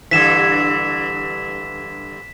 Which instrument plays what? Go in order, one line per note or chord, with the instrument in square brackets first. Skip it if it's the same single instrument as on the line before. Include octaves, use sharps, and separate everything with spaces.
[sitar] G2 D3 E3 [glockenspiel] B6 E7